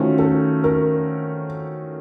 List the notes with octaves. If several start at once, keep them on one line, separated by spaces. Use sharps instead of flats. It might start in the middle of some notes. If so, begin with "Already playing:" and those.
Already playing: D#3 A3 C#4 F4 F#4 C5
A4
A#4